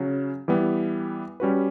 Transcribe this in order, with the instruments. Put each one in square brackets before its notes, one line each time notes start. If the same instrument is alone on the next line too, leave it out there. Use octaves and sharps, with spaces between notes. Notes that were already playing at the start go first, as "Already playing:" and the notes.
Already playing: [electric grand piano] C#3 F#3 C#4
E3 G3 B3
G3 C#4 F#4 B4